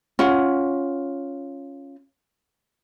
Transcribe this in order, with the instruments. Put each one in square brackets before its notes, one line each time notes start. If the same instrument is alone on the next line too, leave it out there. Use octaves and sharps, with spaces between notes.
[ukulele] C#4 F4 F#5